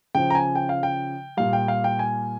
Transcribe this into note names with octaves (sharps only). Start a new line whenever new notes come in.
C#3 F3 G5
A#5
G#5
G5
F5
G5
A#2 G3 F5
G5
F5
G5
G#5